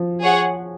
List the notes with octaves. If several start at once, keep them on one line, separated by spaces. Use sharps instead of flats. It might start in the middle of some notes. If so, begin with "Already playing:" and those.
Already playing: F3
G#4 C#5 F#5